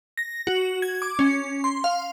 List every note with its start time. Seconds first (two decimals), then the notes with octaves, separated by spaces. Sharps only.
0.17 A#6
0.47 F#4
0.82 G#6
1.02 D6
1.19 C#4
1.64 C6
1.84 F5